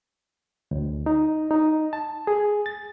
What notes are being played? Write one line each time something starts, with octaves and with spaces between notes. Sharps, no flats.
D2
D#4
D#4
A5
G#4
A6